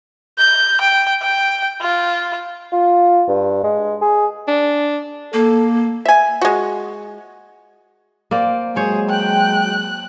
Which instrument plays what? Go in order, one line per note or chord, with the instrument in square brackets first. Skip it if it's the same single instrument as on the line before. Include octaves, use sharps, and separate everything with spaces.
[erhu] G6
G5
G5
F4
[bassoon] F4
G2
G#3
G#4
[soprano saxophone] D4
[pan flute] A#3 [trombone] A4
[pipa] E5 G#5
G#3 F#4
[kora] A#3 C4 D5
[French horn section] F#3 G#3 [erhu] G#4 [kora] C5 C#5
[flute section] G5 [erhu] F#6